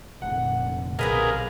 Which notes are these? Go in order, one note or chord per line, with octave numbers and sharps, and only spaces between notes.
F1 A#2 D3 F#5
B1 C3 G#4 A#4 B4 D#5 F5